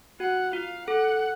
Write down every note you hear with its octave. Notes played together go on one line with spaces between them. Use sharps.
F#4 F#5
F4 F5
A4 F#5